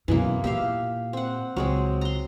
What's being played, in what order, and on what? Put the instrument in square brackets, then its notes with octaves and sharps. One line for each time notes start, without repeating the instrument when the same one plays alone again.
[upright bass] F#2 B2 [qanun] E3 G#3 A#3
[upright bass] A#2 [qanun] G4 E5 F5
[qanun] C4 F#5
[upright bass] C#2 [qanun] F#3 G#3 C4
[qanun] A#5 C6